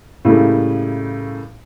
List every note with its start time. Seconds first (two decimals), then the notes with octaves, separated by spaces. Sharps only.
0.25 A2 C#3 G3 A3 A#3